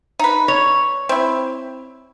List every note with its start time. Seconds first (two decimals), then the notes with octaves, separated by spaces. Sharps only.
0.19 D#4 B4
0.48 C#5
1.09 C4 E4